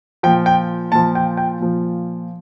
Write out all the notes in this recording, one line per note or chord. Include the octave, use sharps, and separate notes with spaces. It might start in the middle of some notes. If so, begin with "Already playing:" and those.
A#2 F3 G5
G5
A#2 F3 A5
G5
G5
A#2 F3